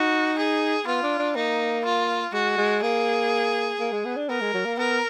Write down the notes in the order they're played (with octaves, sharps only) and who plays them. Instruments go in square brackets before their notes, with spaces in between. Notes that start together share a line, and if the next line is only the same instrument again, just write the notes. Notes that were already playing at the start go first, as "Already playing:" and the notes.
Already playing: [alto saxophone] D#4 [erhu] F#4
[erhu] G#4
[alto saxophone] B3 [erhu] F4
[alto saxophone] D4
D4
[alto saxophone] A#3 [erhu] D#4
[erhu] F4
[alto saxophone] G#3 [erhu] F#4
[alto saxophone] G#3
[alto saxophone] A#3 [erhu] G#4
[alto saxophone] A#3
G#3
B3
D4
[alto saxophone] B3 [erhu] A#4
[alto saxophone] G#3
F#3
A#3
[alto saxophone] B3 [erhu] A#4